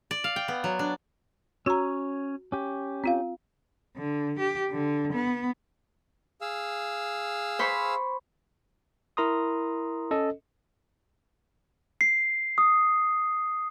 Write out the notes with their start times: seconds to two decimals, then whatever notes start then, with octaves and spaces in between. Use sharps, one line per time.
0.11 D5
0.24 F5
0.36 G5
0.48 B3
0.64 F#3
0.79 D4
1.66 C#4 F#4 C#5 A#5
2.52 C#4 G4
3.04 C4 F4 F5
3.96 D3
4.39 G4
4.70 D3
5.12 B3
6.41 G#4 F5 E6
7.59 C5 B5 C#6
9.17 E4 A#4 A#5 C6 D#6
10.11 C#4 A4 D#5
12.01 C7
12.58 D#6